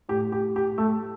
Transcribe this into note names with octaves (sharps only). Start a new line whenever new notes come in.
A2 G4
G4
G4
A3